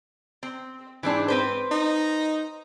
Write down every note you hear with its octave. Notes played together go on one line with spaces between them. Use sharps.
C4
G#2 E3 C4 D4
C4 B4 C5
D#4